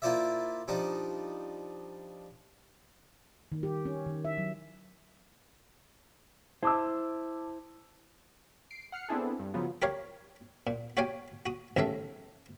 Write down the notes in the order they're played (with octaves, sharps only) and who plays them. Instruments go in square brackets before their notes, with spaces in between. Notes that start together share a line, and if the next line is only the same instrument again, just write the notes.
[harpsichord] A#3 E4 F4 C5 D5 E5
F3 G3 D4 D#4
[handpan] D#3
G4
C#4
D#3
E5
F#3
[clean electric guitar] E4 C5 [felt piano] A5 D6 E6
[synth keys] C7 D7
F#5 F6 C7 C#7
B3 C4 D4 E4 G#4 A4
G2
C#3 F3 F#3 B3 F4
[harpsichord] G4 A#4 C#5 F5
A#2
F#4 G4 C#5 F5 G5 G#5
F#4 D#6
A1 D#2 C#3 A3 E5 F5